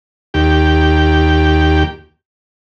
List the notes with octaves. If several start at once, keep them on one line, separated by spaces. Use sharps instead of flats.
D#2 G4